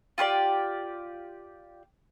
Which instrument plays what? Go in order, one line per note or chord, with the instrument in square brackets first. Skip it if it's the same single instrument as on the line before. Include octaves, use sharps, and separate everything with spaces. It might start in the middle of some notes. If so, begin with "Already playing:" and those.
[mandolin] F4 G4 C#5 D5